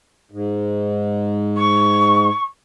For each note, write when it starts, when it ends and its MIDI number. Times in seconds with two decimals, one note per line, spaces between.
0.31 2.29 44
1.57 2.44 85